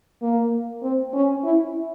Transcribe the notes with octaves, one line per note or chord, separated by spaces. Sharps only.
A#3
C4
C#4
E4